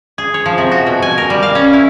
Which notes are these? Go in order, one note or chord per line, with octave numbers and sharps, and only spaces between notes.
G#4
C#5
F3
C3
F#4
B2
G#5
A#4
G3
F5
C#4
E4